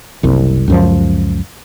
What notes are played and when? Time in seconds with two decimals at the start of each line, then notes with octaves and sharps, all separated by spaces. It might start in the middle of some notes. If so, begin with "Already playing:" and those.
0.23 F#1 C2
0.68 C#2 F#2 F3